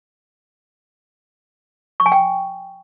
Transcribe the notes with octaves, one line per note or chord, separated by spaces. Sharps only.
C#6
G#5
G5